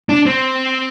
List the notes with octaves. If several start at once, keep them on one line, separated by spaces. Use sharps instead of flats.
D4
C4